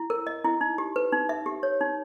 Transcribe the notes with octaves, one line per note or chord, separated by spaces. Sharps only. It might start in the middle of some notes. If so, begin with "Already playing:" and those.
Already playing: E4
A#4
D#5
E4
D#4
G4
B4
D#4
E5
G4
C#5
D#4